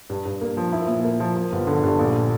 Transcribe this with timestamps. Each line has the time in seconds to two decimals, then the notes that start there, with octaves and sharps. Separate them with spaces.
0.10 G2
0.25 G2
0.41 A#3
0.57 F3
0.73 E4
0.88 A#2
1.04 A#3
1.20 F3
1.36 F3
1.52 G1
1.67 D3
1.83 G2
1.99 A#1